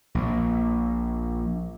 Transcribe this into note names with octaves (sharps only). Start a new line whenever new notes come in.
A#1 A#2